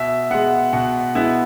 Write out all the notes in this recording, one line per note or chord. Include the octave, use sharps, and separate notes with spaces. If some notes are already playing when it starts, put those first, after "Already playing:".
Already playing: B2 E5
G#3 B3 F#5
B2 F#5
G#3 B3 E4